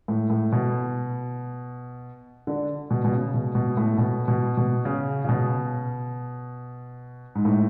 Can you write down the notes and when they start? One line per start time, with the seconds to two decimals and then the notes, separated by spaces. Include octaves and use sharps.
0.08 A2
0.30 A2
0.52 B2
2.47 D3
2.91 B2
3.05 B2
3.12 C#3
3.34 B2
3.55 B2
3.77 A2
3.98 B2
4.28 B2
4.57 B2
4.85 C#3
5.25 C#3
5.29 B2
7.35 G#2
7.45 A2